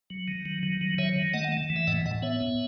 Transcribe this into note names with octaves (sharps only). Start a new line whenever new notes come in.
F#3
D#3
F#3
D#3
F#3
D#3 C#5 E5
D#3
A3 D#5 F#5
A3
E3
E5
A2 D#5 F#5
A2 D#5 F#5
B3 C#5 E5
B3